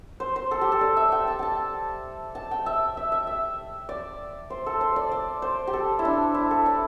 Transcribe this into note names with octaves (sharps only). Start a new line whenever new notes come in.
C5
C5
A4
G4
A4
D5
E5
G5
A5
G5 A5
A5
G5
E5
E5
E5
E5
D5
C5
A4
C5
D5
D5
C5
G4
A4
E4
D4
E4
A4
D5